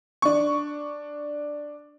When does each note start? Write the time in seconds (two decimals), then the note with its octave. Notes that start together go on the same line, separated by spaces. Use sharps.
0.22 D4 C#6